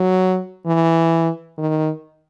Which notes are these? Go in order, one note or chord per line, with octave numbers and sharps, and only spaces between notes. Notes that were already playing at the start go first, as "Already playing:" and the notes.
Already playing: F#3
E3
D#3